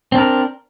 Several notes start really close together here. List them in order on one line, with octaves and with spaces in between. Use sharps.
C4 D4 A#4